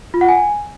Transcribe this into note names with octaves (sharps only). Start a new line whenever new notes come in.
F4
F#5
G#5